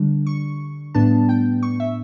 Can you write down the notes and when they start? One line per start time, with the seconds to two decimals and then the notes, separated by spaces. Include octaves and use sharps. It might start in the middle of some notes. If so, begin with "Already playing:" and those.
Already playing: D3 G3 D4
0.26 C#6
0.94 A2 G3 B3 D4 A5
1.29 G5
1.63 C#6
1.80 E5